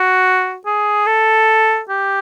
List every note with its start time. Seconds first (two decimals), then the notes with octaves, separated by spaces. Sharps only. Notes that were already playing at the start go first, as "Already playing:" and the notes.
Already playing: F#4
0.66 G#4
1.06 A4
1.89 G4